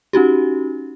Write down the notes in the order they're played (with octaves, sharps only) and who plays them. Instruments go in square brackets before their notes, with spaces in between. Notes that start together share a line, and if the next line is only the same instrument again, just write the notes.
[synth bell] C#4 D#4 F#4 G4